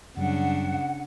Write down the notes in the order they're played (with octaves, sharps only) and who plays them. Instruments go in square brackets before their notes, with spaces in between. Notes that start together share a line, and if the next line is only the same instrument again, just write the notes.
[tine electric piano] F#2 F#3 G3 [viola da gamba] C#3 D4 [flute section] F#5